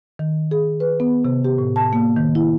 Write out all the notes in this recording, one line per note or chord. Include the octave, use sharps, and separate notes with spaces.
D#3
G#4
B4
B3
C3
G4
A2
A5
A#3
D#3
E4